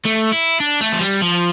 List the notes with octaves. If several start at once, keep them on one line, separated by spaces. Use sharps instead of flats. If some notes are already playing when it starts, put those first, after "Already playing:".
A3
E4
D4
A3
F3
G3
F3